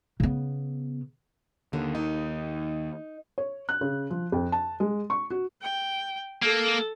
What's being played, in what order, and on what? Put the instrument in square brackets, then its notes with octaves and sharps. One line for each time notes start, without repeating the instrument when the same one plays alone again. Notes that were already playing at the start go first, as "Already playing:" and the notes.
[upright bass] C#3 B3
[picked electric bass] D#2 [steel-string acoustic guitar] D3
[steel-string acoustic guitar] D#4
[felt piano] C#5
F#6
C#3
F3
F2
A5
G#3
C#6
F#4
[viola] G5
[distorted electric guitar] A#3 [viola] A4